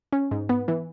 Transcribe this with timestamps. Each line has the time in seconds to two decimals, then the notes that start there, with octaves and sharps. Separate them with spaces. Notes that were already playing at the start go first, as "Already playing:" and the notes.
0.12 C#4
0.31 G#2
0.49 B3
0.68 E3